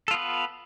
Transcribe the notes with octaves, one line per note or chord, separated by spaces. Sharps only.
B3 F4 A4 B4